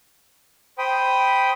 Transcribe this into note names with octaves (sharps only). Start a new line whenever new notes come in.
C5 G5 B5 D#6